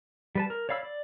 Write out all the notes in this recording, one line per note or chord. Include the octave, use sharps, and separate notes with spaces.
G3 B4 A5
A#4
C#5 D5 F5 B5 E6
D5